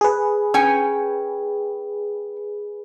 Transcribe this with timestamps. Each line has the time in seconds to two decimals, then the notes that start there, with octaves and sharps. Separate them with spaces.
0.01 G#4 B4
0.54 C#4 G5 G#5